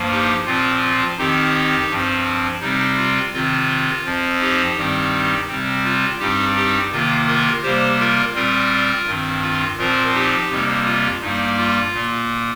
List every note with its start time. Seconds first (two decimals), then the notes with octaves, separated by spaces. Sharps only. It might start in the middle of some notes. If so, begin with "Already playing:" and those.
Already playing: G2 F3 A#3
0.11 D#4 G4
0.46 A#2 F3 C4 F4
0.82 F4
1.18 F2 D#3 C4 D#4 G4
1.89 G2 F3 C4
2.61 C3 G3 C4 D#4
2.97 F4
3.33 C3 D#3 C4 F4
4.05 F2 F3 C4
4.40 D#4 G4
4.77 G2 D#3 G3 C4
5.48 C3 G3 C4
5.84 F4
6.19 G2 G3 C4 D#4 G4
6.56 D#4 G4
6.92 C3 D#3 A#3 F4
7.27 F4 A#4
7.63 C3 G3 A#3 G4 C5
7.99 F4 A#4
8.35 A#2 G3 C4 F4 A#4
9.07 G2 D#3 C4
9.42 F4
9.78 A#2 F3 C4 F4 A#4
10.14 D#4 G4
10.50 F2 C3 G3 A#3
10.86 F4
11.21 G2 G3 A#3 D#4
11.57 F4
11.94 A#2 A#3